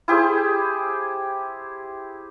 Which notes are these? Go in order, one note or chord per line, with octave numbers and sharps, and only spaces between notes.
E4 G4 G#4 C5